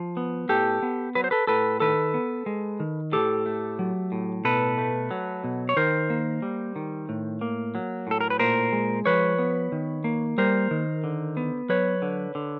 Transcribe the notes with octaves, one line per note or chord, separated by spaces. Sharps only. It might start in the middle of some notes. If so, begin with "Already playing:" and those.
Already playing: F3
B3
A2 G4 A4
B3
F#3 B4
C5
A4 B4
A2 A4 B4
D#3 A4 B4
B3
G#3
D#3
A2 G4 A4
A3
F#3
A2
B2 A4 B4
A3
F#3
B2
C#5
D#3 A#4 C5
A#3
G3
D#3
A2
A#3
F#3
A2 A4
A#4
B4
A#2 A#4 C5
G#3
F3 B4 C#5
B3
D#3
A#3
G3 A#4 C5
D#3
D3
B3
F#3 B4 C#5
D3
D3